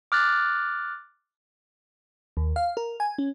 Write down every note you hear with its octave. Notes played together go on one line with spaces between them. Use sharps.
D6 F6 F#6 A6
D#2
F5
A#4
G#5
C#4